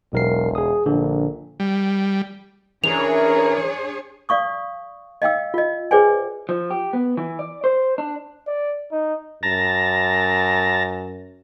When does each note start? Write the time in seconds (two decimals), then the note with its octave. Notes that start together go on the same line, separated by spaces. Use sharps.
0.13 E1 B1 A#4 C7
0.55 G#4 D#6
0.86 A#1 D3
1.60 G3
2.84 E3 C#4 D4 G#4 A#4 C#5 F7
4.29 D5 F5 C#6 D#6
5.22 D#5 F5 G5 E6
5.54 F4 D#5
5.91 G#4 B4 C5 D5 G5 G#5
6.49 F3
6.70 G4
6.93 B3
7.17 E3
7.39 D5
7.64 C5
7.98 D4
8.47 D5
8.92 D#4
9.43 F#2 A5 A#5